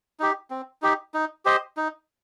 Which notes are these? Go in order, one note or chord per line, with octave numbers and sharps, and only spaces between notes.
D#4 G4
C4
D#4 G4
D#4
G4 C5 D#5
D#4